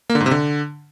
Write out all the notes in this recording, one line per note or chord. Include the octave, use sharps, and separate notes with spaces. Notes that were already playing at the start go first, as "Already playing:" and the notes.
A#3
D3
G#2
C3
D3